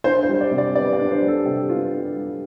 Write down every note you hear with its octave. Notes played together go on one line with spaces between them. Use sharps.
D4 C5
C5
G3
D5
C3
D5
B3 D5
D5
D4
C5
G3
A4
C3 G4
B3 F4
D4 A4
G3